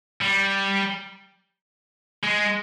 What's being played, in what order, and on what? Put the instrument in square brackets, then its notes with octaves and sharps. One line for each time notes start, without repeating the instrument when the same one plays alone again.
[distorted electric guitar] G3
G#3